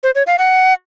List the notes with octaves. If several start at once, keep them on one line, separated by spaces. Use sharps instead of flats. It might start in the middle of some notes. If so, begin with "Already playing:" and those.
C5
C#5
F5
F#5